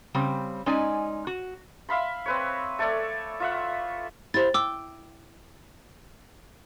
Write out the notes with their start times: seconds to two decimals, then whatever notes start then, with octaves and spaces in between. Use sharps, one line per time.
0.14 C#3 G3 C4
0.66 G#3 C#4 D#4 D5 G#5
1.27 F#4
1.89 E5 F5 B5 C6
2.26 C4 B4 C#5
2.79 A3 A4 C#5 D5
3.40 F4 E5 F#5
4.34 E4 G4 C5 A6
4.54 G5 D6 E6